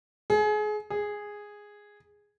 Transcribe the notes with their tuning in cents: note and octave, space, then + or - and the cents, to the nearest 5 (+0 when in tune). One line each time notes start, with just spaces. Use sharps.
G#4 +30
G#4 -5